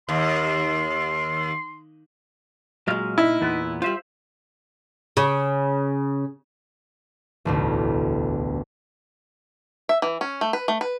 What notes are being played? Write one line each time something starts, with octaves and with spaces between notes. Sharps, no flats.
D#2 C6
A#2 F#3 G#3 D#5 F5
D#4 E4
E2 A#2 B3
G3 F4 C5 E5
C#3
E1 A1 D2
E5
E3
C#4
A3
B4
A3
B4